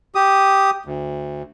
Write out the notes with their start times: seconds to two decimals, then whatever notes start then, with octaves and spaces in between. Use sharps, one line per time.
0.15 G4 D#6
0.85 D2